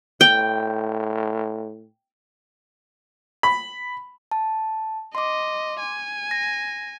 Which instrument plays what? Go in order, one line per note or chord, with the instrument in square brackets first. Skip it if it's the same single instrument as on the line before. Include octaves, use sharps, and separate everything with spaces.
[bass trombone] A2 [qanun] G5
[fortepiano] B5
[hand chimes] A5
[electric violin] D#5 [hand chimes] C6 D6
[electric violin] G#5
[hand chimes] A#6